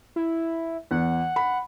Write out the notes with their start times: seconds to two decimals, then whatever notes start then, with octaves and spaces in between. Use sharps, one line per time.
0.16 E4
0.91 E2 F#5
1.36 B5